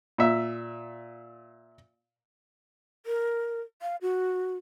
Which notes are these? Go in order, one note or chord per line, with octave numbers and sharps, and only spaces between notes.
A#2 E5
A#4
F5
F#4